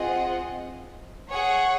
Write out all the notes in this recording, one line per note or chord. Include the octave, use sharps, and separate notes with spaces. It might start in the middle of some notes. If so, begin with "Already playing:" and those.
Already playing: C4 F4 G#4 D#5 F#5
G#4 C#5 F#5